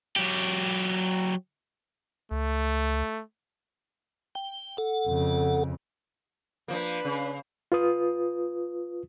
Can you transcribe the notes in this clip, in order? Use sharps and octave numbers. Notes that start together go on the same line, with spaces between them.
F#3 G4
C#2 A3
G5
A4 F#5
F2 C#3
F3 A#3 D4 B4
C#3
F4 B4 D#6